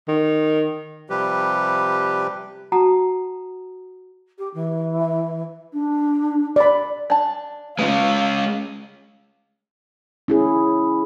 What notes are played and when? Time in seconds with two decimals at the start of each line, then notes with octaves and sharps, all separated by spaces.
0.08 D#3
1.10 C3 F3 G3 G4 B4
2.72 F#4 F#5 A5 A#5 D#6
4.38 G4
4.54 E3
5.72 D4
6.56 D5 B5
7.10 D4 A5
7.79 G#3 C#4 F4 B4 F5
10.28 C#4 E4 G#4